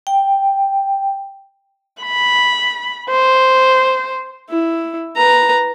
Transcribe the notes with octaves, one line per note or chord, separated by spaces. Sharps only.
G5
B5
C5
E4
B4 A#5